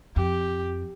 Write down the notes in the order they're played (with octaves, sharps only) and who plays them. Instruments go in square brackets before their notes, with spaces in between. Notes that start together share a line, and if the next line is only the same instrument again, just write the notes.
[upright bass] F2 [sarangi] G4